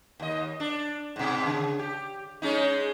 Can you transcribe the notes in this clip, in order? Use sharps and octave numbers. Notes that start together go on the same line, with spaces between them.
D#2 D#5
D4
G#2 B2
C#3
G4
G#3 C#4 D#4